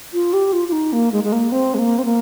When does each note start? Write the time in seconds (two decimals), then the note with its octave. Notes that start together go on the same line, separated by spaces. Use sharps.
0.13 F4
0.33 G4
0.53 F4
0.68 F4
0.72 D#4
0.93 A#3
1.12 G#3
1.24 G#3
1.32 A#3
1.52 C4
1.74 G#3
1.78 A#3
1.99 C4
2.05 A#3